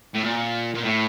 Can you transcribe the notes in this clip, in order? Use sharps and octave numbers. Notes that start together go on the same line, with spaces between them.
A2
A#2
A#2
A2